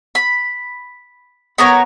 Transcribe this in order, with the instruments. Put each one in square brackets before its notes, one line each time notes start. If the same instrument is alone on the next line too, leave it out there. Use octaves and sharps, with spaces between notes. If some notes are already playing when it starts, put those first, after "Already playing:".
[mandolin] B5
B3 A#4 C#5